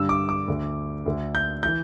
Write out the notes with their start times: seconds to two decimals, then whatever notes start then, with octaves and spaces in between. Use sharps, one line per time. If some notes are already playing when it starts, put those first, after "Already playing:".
Already playing: G2 D3 E6
0.09 D6
0.29 D6
0.48 D2 D3
1.06 D2 D3
1.35 G6
1.63 E3 G6